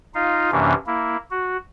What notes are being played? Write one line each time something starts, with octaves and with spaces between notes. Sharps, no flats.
D#4 F4 F5
F#2 C3 E3 A#3 C#4 D4
A#3 E4
F#4